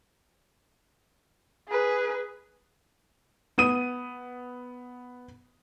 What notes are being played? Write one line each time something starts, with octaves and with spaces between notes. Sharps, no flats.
G#4 B4
B3 D#6 D#7